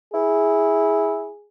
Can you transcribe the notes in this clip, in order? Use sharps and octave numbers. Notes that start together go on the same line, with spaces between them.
E4 G#4